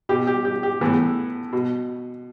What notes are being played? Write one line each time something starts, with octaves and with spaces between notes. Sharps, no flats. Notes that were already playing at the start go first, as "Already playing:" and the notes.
B2 G4
G4
G4
G4
A2 E3 B3
B2